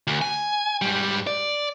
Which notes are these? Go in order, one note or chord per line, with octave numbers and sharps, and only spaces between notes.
D2
G#5
G#2 G3
D5